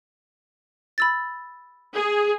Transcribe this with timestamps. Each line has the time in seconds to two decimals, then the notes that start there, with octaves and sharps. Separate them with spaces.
0.98 B5 E6 A6
1.94 G#4